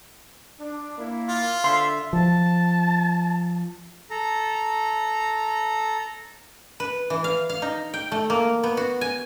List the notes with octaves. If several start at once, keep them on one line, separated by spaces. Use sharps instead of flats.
D4
A#3 E4
F4
D3 E5 C6
F3 A5
A4 A#5
B4
E3
F5
F5
D#4
G5
A3
A#3
B3
F#4
G#5